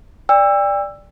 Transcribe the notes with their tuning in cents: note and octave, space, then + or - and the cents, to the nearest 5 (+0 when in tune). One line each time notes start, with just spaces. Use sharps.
D5 +0 G5 +40 E6 +10